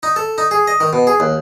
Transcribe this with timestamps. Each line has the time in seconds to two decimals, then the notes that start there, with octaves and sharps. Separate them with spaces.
0.03 D#4
0.16 A4
0.38 D#4
0.51 G#4
0.68 D#5
0.80 D#3
0.93 B2
1.07 G#4
1.20 D#2